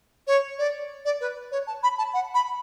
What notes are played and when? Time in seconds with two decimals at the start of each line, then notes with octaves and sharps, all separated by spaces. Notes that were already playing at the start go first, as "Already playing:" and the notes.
0.27 C#5
0.59 D5
1.05 D5
1.21 B4
1.52 C#5
1.67 A5
1.83 B5
1.98 A5
2.13 F#5
2.34 B5